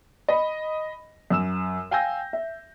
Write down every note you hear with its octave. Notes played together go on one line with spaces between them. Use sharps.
D#5 B5
F#2 E6 E7
F5 G5 G#5 E6 G6 A#6
E5